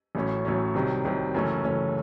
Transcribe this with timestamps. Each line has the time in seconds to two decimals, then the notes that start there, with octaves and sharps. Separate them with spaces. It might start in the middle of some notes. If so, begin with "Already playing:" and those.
0.15 A1 A2 F#3 C#4
0.45 A1 A2 F#3 C#4
0.74 C2 C3 D#3 F#3
1.04 C2 C3 D#3 F#3
1.34 F#1 F#2 E3 A3 C#4
1.64 F#1 F#2 E3 A3 C#4